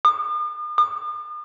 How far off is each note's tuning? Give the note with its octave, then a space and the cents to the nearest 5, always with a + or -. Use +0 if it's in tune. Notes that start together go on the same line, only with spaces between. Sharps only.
D#6 -45
D#6 -45